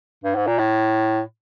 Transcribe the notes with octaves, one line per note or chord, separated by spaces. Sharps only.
G2
G#2
A#2
A2